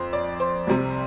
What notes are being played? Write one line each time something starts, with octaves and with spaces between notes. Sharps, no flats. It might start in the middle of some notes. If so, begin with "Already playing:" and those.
Already playing: F2 C5
D5
C5
C2 C3 G3